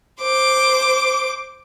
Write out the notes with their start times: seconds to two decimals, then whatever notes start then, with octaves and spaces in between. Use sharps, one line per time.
0.21 C5 D6